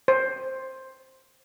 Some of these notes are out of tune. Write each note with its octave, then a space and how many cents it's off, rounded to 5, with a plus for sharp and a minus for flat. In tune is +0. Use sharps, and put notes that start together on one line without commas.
C5 +10